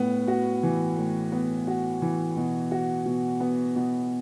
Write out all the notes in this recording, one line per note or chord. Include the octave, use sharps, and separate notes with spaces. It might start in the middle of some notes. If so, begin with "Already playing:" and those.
Already playing: A2 B3
F#4
E3
A2
B3
F#4
E3
B2
F#4
B2
B3
B2